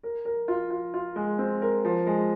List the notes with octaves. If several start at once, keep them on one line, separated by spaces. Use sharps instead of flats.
A#4
A#4
F4
F4
F4
G#3
C4
A#4
F3
G#3